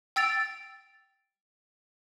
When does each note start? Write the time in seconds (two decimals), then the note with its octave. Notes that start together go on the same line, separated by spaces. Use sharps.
0.16 G5 E6 A6 D7 F7